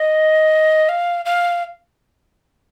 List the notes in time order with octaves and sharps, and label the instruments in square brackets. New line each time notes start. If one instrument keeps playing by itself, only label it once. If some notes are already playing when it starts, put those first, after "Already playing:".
Already playing: [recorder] D#5
F5
F5